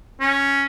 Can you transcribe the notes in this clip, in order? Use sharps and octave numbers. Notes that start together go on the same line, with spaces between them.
C#4